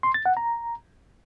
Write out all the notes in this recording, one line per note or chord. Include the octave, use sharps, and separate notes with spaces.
C6
A6
F#5
A#5